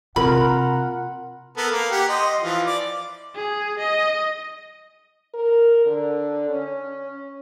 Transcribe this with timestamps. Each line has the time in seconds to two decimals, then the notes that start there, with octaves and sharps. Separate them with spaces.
0.16 C3 F4 A#4 F#5 B5
1.57 B3 A4 A#4
1.71 A#3
1.91 G4 F#5
2.09 D#5 C6
2.41 E3 F3 F4
2.66 D5 D6
3.35 G#4
3.79 D#5
5.34 A#4
5.86 D3
6.49 C#4